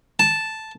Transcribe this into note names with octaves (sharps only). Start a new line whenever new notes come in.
A5